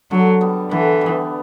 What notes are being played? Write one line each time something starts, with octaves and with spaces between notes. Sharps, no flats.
D3 F#3
G3 B3
D3 E3
G3 B3